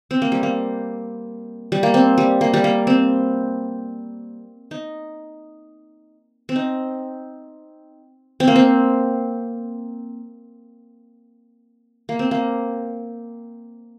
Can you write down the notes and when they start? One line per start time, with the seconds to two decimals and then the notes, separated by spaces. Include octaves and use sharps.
0.11 C4
0.22 A#3
0.32 G3
0.43 A#3
1.72 G3
1.83 A#3
1.94 C4
2.18 G3
2.41 A#3
2.54 G3
2.64 A#3
2.87 C4
4.71 D#4
6.49 C4
6.56 D#4
8.40 C4
8.48 A#3
8.56 C4
12.09 A#3
12.19 C4
12.31 A#3